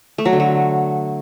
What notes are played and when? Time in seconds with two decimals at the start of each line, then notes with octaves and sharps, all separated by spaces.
0.18 A3
0.25 F#3
0.33 D3
0.40 F#3